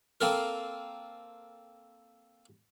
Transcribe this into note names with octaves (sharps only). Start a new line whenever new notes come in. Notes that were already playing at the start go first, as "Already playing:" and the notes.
A#3 C4 A4 A#4